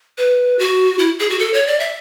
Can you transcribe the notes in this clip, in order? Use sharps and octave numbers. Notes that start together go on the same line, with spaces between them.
B4
F#4
E4
G#4
F#4
A4
C#5
D5
E5